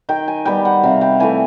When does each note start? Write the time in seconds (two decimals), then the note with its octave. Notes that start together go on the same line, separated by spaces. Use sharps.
0.09 D#3 G5
0.28 G#5
0.45 G3 B3 G5
0.65 F#5
0.83 C3 F5
1.01 G5
1.20 E3 A3 G#5